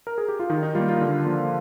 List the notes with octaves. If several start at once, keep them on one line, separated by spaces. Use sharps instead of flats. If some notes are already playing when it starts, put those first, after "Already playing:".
A#4
G#4
G4
F4
D#3 D#4
D#4
G3 A#3 F4
F4
D3
F3 A#3